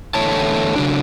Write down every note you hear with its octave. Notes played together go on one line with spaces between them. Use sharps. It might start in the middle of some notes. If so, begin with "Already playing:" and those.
E2 D3 A3 C#5 A5
C#3 F#3 D4